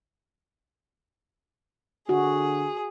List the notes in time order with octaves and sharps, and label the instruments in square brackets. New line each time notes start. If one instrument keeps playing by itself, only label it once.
[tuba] D3 [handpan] F#4 [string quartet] G#4